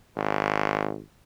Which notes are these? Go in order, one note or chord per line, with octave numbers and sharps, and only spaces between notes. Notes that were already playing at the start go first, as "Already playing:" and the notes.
G#1